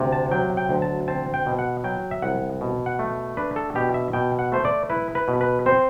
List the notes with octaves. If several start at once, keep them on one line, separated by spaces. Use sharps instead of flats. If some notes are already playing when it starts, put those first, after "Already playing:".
Already playing: D2 C3
A5
F#3 G5
G5
D2
A5
C4 A5
G5
B2
F#5
F#3 G5
E5
C2 F#5
B2
F#5
A3
D4 B4
A4
B2 G4
E5
B2 G5
F#5
A3 C5
D5
E4 B4
B4
B2
B4
C4 C5